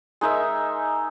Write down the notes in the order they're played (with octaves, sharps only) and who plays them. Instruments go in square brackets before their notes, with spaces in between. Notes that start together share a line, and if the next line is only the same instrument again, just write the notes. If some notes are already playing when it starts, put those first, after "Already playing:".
[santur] G#3 D#4 A#4 E5